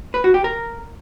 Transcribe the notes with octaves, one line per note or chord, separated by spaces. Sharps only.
B4
F#4
G4
A#4